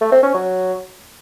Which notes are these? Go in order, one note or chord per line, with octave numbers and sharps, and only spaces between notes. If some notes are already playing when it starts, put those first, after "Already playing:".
A3
C4
C#4
F#3